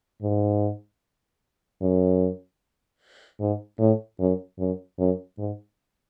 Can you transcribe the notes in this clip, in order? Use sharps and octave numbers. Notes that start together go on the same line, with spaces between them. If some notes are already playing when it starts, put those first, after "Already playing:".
G#2
F#2
G#2
A2
F#2
F#2
F#2
G#2